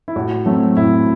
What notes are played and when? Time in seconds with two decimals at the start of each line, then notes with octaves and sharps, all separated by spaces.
0.08 E4
0.16 A2 F#4
0.46 F#3 A3 C4
0.77 A2 E4